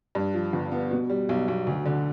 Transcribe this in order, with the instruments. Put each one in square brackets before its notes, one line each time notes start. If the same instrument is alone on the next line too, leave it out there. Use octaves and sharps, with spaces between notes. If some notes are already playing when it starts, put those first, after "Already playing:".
[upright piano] G2
F3
G1
B3
B2
G3
B1
B1
D2
D3